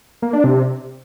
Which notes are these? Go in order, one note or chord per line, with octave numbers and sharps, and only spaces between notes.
A#3
D4
C3